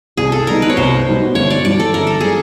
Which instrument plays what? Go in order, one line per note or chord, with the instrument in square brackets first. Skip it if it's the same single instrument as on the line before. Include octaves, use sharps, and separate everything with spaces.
[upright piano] C2 [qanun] G#4
[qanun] A4
[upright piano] B2 G3 B3 D#4 [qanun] A#4
[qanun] B4
C#5
[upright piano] C2 [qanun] C5
[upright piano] B2 G3 B3 D#4
[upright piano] G1 [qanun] C#5
[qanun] D5
[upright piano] G2 E3 G3 [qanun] D5
[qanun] A4
[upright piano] G1 [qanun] A#4
[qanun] A4
[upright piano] E3 G3 [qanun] G#4